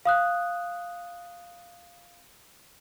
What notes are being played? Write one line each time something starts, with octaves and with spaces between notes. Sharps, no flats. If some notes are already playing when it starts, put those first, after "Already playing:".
F5 D#6 F#6